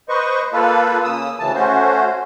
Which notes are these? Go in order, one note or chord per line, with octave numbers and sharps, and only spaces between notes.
B4 C5 D#5 C#6
A#3 F4 A4 B4
C#3 A#3 D#6 E6
D2 C#3 E3 A5
A3 C#4 F#4 C5